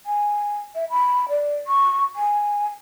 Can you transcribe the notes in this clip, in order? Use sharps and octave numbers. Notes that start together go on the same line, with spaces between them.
G#5
E5
B5
D5
C#6
G#5